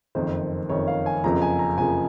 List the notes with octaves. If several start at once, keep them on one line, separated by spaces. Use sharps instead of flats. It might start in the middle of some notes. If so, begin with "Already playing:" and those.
F#1 F2 D#3 C5
F#1 F2 D#3 C#5
F5
G#5
F#1 F2 C#3 F3 A#5
G#5
A#5
F#1 F2 C#3 F3 G#5